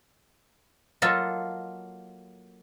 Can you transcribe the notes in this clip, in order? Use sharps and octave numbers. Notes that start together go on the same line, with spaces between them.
F#3 A#3 F4 A4 D#5